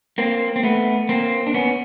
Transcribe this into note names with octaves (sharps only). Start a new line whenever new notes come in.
A#3 C4
C4
A3 B3
A#3 C4
D4
B3 C#4